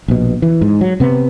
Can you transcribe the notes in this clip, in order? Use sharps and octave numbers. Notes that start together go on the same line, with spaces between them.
A#1 B2
E3
G#2
F#3
C3 B3